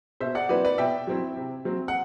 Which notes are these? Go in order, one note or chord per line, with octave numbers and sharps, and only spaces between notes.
B2 C5 E5
D5 F#5
F#3 C4 E4 B4 D5
B4 D5
B2 E5 G5
F#3 C4 E4
C3
F#3 C4
F#5